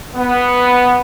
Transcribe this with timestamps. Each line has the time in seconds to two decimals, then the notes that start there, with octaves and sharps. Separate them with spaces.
0.16 B3